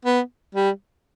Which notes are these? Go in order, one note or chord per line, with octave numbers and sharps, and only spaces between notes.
B3
G3